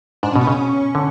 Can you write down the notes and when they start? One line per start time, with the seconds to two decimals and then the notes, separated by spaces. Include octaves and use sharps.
0.23 G#2 D4
0.32 B2 C#4
0.41 B3
0.47 C#3 C#4
0.95 D3